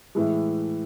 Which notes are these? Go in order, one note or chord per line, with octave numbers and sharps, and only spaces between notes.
A2 E3 G#3